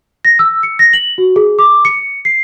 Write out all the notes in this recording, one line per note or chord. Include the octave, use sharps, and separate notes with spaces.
A#6
E6
C#7
A#6
F#7
F#4
G#4
D6
C#7
C7